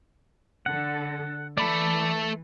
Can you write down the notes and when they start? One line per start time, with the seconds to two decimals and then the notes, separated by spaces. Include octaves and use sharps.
0.66 D3 A4 F#5
1.57 E3 A3 A4 D5 B5